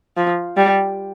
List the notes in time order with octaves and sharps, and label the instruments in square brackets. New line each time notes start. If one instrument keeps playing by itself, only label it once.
[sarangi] F3
G3